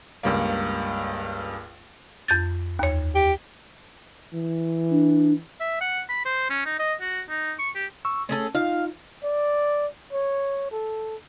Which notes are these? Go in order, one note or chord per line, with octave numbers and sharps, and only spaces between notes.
C#2 G2 A#3
F2 G6 A6
D#2 C#5
G4
E3
D4
E5
F#5
B5
C5
C#4
D#4
D#5
F#4
D#4
C#6
G4
C#6 E6
A3 C#4 G#4 A4
D#4 F4 F5
D5
C#5
A4